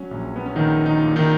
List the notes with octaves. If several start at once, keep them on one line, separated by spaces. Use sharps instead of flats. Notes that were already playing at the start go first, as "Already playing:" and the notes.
Already playing: F#3 C#4
A#1
B3
C#4
A#1 D#3 D#4
D#3 D#4
A#2
D#3 D#4